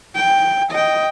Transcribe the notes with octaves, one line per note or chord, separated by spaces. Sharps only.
G5
D#5 G5